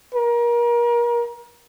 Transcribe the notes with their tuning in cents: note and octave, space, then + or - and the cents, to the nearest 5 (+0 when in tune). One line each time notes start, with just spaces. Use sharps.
A#4 +30